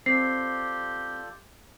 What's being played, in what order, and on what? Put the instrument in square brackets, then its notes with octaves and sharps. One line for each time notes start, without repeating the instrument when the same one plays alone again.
[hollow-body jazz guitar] C4 [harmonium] F4 A4 D5 [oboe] G4 [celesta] C7